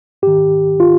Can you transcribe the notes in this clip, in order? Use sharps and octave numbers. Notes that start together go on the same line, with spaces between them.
G#2 D#3 G4
F4